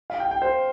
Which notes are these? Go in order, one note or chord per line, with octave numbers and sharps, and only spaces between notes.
F5
G5
G5
C5